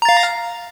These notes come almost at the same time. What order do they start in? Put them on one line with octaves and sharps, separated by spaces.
A#5 A6 F5